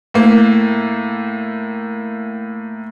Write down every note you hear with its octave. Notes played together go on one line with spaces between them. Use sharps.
A2 A#3